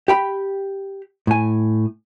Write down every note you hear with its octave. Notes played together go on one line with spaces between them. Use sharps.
G4 G5 B5
A2 G#5